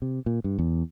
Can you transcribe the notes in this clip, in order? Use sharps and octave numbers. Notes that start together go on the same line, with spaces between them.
C3
A#2
G2
E2